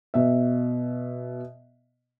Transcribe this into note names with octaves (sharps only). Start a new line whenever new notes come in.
B2 E5